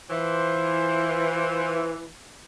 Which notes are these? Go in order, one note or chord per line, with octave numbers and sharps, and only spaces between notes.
E3 F4 C5